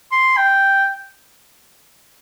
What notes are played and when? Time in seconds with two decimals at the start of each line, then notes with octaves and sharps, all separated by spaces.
0.12 C6
0.37 G5